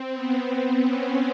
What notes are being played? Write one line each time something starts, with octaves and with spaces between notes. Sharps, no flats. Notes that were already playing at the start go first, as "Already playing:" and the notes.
Already playing: C4
B3
B3
C#4